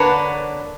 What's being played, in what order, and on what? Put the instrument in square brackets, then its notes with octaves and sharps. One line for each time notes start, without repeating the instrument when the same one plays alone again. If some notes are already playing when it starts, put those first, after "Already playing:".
Already playing: [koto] D3 A#3 D4 F#4 C#5 [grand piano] B4